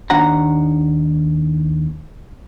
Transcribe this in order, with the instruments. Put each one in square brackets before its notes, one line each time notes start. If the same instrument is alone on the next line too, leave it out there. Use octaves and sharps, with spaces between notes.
[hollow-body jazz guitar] D#2 D#3 D4 F#5 A#5